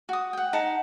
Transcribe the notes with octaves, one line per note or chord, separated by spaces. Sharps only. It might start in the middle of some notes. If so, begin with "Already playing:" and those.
F#4 D#6
F#5 G5
D#4 F#5 A5 B5